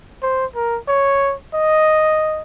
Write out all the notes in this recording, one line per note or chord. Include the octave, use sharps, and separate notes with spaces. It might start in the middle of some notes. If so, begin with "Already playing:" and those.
C5
A#4
C#5
D#5